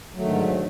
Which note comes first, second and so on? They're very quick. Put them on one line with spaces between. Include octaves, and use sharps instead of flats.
F#3 A3 D#3 D3 G#2